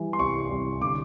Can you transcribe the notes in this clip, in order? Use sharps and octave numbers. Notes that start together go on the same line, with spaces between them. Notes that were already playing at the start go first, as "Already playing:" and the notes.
Already playing: E3 G3
C6
C2 C#6
C2
D3 D6